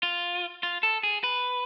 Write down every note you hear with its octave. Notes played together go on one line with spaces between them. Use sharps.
F4
F4
A4
G#4
B4